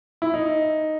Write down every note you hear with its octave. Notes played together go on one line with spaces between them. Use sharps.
E4
D#4